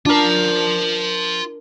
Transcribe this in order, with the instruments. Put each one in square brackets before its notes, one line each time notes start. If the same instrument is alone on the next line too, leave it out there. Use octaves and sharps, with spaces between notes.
[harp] D4 A#4 [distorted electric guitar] F4 A5